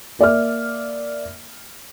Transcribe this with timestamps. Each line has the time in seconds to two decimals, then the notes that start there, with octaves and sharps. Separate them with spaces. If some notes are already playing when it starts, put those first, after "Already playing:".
0.19 A#3 D5 E5 F6